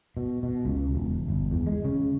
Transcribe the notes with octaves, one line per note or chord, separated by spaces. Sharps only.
B2
B2
C#2
E1
G1
E2
G#3
C#3